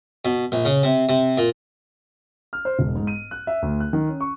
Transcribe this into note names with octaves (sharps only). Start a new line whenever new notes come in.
B2
A#1
C#3
C3
C3
A#2
F6
C5
E1
G#2
D#7
F#6
E5
D2
F#6
D#3
C#4
C#6